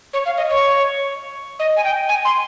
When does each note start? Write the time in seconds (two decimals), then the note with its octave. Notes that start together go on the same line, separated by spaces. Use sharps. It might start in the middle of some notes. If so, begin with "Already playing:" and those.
0.13 C#5
0.25 F5
0.37 D#5
0.49 C#5
1.59 D#5
1.76 G#5
1.84 G5
2.09 G#5
2.25 C6